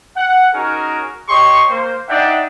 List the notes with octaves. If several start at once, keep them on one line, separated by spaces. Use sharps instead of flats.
F#5
C#4 D#4 F#4 G#4 A#4
G4 C#5 D#5 C6 C#6
A#3 C5
D4 D#4 D5 E5 F#5 G5